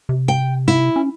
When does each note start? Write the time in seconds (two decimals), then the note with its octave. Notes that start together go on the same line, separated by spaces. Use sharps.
0.09 C3
0.28 G5
0.68 E4
0.96 C#4